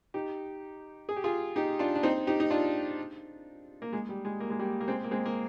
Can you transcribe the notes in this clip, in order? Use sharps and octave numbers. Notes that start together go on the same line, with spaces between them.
D#4 G4
G#4
G4
F4 G#4
D#4 G4
D4 F4
D4
C4 D#4
D#4 G4
D#4
D4 F4
A#3
G#3
G3
G#3
A#3
G#3
G3 A#3
A#3
G#3 C4
A#3
G#3 C4
A#3